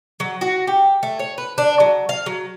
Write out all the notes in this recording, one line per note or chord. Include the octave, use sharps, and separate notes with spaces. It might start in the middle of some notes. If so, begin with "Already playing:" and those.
F#3
F#4
G4
A3
C#5
B4
D4
F#3
F5
F#3